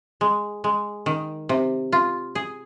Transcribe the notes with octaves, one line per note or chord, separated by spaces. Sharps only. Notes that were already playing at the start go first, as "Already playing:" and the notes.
G#3
G#3
D#3
C3
F4
G#4